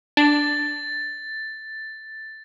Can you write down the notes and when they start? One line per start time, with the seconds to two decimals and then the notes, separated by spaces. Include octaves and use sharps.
0.17 D4 A6